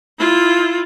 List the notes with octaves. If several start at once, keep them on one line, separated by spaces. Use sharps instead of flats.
E4 F4